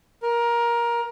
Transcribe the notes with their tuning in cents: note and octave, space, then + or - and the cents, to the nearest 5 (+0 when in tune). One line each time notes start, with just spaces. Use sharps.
A#4 +20